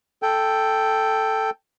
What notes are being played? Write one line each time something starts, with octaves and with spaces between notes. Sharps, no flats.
A4 G5